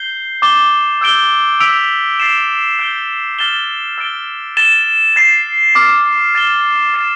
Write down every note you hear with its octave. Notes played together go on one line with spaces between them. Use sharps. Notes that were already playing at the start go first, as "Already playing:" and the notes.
Already playing: G6 C7 G7
D6 A6 E7 G7
E6 G6 D7 G7
E6 B6 D7 F7
A6 C7 E7
G6 D7 G7
F6 A6 E7 G7
E6 A6 D7 G7
A6 E7 G7
A6 C7 E7
D6 F6 A6 E7
A6 E7 G7
F6 A6 C7 E7